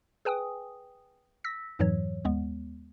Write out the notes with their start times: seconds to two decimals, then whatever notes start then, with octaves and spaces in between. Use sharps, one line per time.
0.25 G#4 B4 G5 G#5 D#6
1.44 E6 A#6 B6
1.79 F2 G#2 E3 F#3 C#5
2.25 D#2 G#3 B3